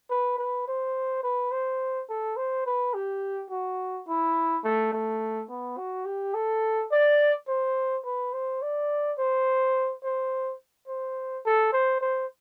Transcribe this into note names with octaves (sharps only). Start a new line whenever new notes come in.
B4
B4
C5
B4
C5
A4
C5
B4
G4
F#4
E4
A3
A3
B3
F#4
G4
A4
D5
C5
B4
C5
D5
C5
C5
C5
A4
C5
C5